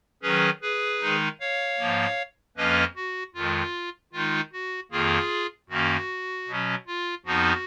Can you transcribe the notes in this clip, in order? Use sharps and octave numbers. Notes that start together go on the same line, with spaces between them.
D#3 F#3 C#4 G#4 B4
G#4 B4
D#3 G#3 D#4
C#5 F5
G#2 F3 A#3
F2 F3 A#3 C#4 B4 D#5
F#4
F2 D#3 G#3 F4
D#3 G#3 D#4 F4
F#4
F2 D#3 A#3 F4 G#4
F#2 D#3 A#3 C#4 F#4
B2 F#3 C#4
F4
F2 F3 B3 D#4 F#4